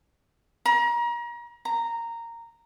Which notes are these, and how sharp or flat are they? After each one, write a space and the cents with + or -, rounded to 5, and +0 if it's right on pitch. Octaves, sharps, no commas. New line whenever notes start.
A#5 +35
A#5 -10